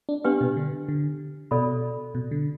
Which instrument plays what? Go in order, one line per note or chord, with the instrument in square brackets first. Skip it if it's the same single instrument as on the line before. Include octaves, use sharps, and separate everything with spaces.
[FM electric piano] D4
[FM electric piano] B3 [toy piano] D4 G4 B4 G5
[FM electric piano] B2
D3
D3
[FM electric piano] B2 [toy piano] A4 D5 B5
[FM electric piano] B2
D3